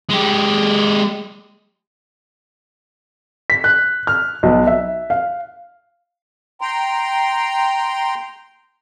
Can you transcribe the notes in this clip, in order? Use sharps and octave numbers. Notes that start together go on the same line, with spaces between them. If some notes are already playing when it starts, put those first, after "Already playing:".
G#3 G4
B6
F#6
F6
B1
E5
F5
G5 A#5 C6